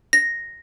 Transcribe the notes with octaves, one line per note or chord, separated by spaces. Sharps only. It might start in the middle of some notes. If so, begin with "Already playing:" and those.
A#6